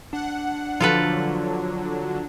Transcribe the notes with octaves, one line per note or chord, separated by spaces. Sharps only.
D4 F#5
D3 F3 F#3 F4 A4 B4